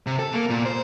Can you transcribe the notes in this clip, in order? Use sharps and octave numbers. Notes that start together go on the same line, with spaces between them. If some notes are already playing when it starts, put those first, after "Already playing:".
C3
A4
A#3
A#2
C5